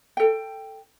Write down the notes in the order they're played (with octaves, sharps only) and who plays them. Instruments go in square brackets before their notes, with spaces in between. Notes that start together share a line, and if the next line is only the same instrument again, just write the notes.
[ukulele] A4 G5